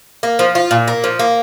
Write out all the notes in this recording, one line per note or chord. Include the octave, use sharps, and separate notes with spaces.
A#3
F3
F4
A#2
A#3
F3
A#3